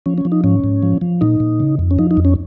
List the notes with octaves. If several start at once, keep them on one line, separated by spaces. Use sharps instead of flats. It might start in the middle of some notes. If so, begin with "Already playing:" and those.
F3 C#4
C#4
F3
D#4
G#2 C#4
G#2
F3
F3
A#2 D#4
A#2
C#3
F2
C#4
F3 D#4
D#4
F2
C#4